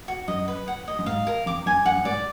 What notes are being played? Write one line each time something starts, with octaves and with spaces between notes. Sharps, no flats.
F#4
F#2 D#5
B4
F#5
D#5
F#2
G#2 F5
A#4
F2 D6
F#2 G#5
F#2 F#5
F#2
G#2 D5